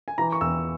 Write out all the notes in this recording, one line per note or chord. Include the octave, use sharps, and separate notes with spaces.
G#5
E3 A#5
C#6
E2 E6